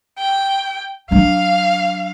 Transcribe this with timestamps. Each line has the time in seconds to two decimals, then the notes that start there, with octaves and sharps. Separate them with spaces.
0.18 G5
1.11 F#3 D4 F5